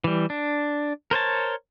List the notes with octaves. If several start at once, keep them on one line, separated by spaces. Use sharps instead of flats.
E3 G3
D4
A#4 C5 C#5 A5